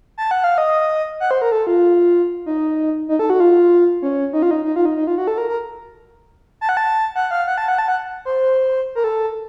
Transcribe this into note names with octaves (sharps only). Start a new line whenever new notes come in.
A5
F#5
F5
D#5
F#5
C5
A#4
A4
F4
D#4
D#4
A4
F#4
F4
C#4
D#4
F4
D#4
D#4
F4
D#4
D#4
F4
F#4
A4
A#4
A#4
A5
F#5
A5
F#5
F5
F#5
A5
F#5
A5
F#5
C5
A#4
A4